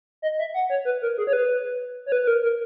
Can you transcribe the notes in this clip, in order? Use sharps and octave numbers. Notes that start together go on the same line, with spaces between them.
D#5
E5
F#5
C#5
B4
A#4
G#4
C#5
B4
C#5
B4
B4
A#4
A#4